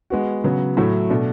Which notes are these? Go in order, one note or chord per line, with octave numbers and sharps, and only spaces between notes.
G#3 B3 F#4
C#3 F#3 B3
A2 F#3 A3 E4
B2 A3 D4